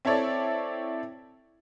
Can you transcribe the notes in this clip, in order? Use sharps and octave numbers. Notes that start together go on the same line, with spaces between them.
C4 E4 A4 C#5 D5